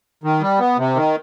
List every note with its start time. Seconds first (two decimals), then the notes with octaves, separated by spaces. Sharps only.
0.24 D#3
0.41 G3
0.59 B3
0.78 C3
0.96 D#3